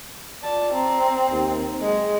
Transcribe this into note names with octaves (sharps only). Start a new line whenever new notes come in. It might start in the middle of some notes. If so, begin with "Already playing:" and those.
F4 D5 A5
C4 A#5
D#2
B1 G#3 G#4